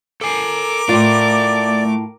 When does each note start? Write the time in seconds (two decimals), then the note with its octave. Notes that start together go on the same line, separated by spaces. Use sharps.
0.21 A4 A#4 G#5 D6
0.89 A2 A3 F4 D5